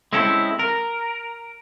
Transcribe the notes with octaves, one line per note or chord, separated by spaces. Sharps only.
G#3 C4 C#4 E4 G4 A4
A#4